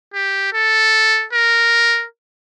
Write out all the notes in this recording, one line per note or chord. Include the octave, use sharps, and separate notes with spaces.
G4
A4
A#4